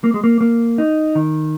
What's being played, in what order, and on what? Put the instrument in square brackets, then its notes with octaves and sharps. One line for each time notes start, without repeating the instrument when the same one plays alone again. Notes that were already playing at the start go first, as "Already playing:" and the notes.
[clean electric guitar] A#3
G#3
A#3
A#3
D#4
D#3